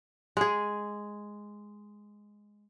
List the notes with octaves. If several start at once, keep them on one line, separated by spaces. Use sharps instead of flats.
G#3 G#4